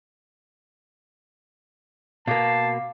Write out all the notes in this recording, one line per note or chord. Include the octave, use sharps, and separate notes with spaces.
B2 A#3 F5 A5 D6 C7